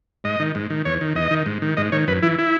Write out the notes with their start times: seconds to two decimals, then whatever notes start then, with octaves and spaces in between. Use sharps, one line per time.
0.24 G#2 D#5
0.40 D#3
0.55 G#2
0.70 D#3
0.85 E2 C#5
1.01 D#3
1.15 E2 D#5
1.31 D#3
1.46 G#2
1.62 D#3
1.77 G#2 D#5
1.92 D#3 C#5
2.07 F#2 B4
2.23 E3 E4
2.38 E4